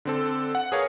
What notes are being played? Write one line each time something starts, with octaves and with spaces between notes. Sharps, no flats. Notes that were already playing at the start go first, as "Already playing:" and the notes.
D3 C4 A4
F#5
G#4 A#4 B4 C#5 F5